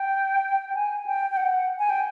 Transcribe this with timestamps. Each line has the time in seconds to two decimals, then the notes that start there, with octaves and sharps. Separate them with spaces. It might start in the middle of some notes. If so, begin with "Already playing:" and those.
Already playing: G5
0.75 G#5
1.06 G5
1.31 G5
1.37 F#5
1.79 G#5
1.90 G5